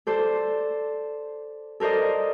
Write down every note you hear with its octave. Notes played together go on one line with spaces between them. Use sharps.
A4 C5 D5
A4 A#4 C5 D5 D#5